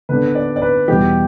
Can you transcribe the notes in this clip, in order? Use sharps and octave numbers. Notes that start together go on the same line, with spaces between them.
D3 B3 D4 B4
D5
D5
B4
E2 B2 G3 G4